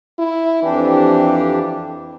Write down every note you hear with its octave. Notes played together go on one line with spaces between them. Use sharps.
E4
F2 E3 D4 G4